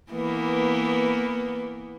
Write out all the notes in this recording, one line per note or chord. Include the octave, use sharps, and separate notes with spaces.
E3 A#3 B3